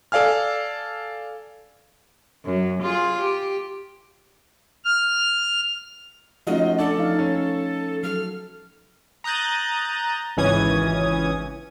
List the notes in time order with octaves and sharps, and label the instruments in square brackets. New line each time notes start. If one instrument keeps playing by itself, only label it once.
[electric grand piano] A4 D5 F5 G#5 F6
[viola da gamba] F#2 F#3
F4 G#4
G4
[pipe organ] F6
[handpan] F3 A3 C#4 [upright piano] D#4 F4 F#4 [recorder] D#5
[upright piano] D4 [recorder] A4
[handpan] F3 D#4 F5
[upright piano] C#4
[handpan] F#3 A4 [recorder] F6
[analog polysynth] A#5 D#6 F#6 G6 A6
G#1 C#2 E3 C#4 D#6 G#6